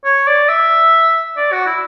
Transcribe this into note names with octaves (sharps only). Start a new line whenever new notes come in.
C#5
D5
E5
D5
F#4
E4